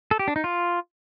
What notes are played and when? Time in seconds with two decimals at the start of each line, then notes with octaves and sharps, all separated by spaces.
0.11 A4
0.19 G4
0.28 D4
0.36 D#4
0.44 F4